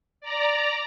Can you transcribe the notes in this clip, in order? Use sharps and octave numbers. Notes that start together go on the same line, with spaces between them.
D5 A#5